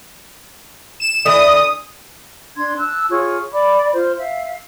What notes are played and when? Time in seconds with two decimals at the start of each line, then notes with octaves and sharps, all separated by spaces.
1.00 E7
1.25 D3 E3 D#6
2.57 D4 C6 G#6
2.77 A5 E6 F#6
3.10 F4 G#4 C#5 C#6
3.53 D5 B5 D6
3.93 F4 C5
4.19 E5 F5